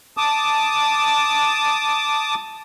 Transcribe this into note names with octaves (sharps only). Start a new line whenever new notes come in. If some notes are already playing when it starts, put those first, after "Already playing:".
A5 D6 D#6